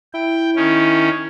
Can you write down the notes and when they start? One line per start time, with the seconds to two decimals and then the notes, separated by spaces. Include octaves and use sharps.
0.14 E4 G5
0.56 D#3 C#4